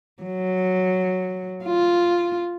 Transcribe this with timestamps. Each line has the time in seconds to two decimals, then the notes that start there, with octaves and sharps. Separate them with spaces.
0.23 F#3
1.65 F4